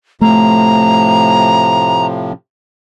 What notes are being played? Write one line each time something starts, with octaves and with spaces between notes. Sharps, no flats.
A2 C3 F3 A3 A#5